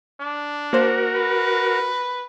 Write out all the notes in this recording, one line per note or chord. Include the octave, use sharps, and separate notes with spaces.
D4
A#3 F#4 A#4 C5
B4